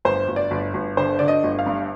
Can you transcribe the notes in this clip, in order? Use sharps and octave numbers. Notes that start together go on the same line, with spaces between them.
G1 C5
G1
D5
G1
G1
D3 C5
D3 D5
D#5
G1
F5
G2